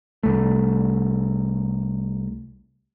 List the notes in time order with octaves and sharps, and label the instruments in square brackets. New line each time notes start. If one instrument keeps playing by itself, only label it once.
[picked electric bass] C2 A3